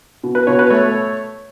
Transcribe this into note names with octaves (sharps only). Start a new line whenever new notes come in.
B2
B4
B2 C#5
B4
A3 C#5